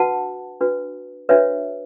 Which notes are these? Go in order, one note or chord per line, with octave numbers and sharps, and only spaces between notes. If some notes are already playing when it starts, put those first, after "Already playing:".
Already playing: D4 F#4 B4 F#5 A5
D4 F#4 B4
D4 F#4 B4 C#5 E5